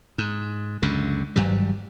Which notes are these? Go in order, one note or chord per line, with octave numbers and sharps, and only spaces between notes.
G#2
C#2 F#2 D3
G#1 G2 F#3 G3